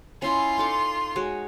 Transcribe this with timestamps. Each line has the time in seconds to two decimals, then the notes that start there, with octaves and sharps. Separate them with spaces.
0.22 C#4 E4 F4 D#5 C6
0.58 D#4 A4 D6
1.16 G#3 F#4 C#5